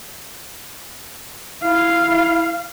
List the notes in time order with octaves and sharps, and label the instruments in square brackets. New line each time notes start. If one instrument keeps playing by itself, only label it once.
[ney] E4 [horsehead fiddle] F5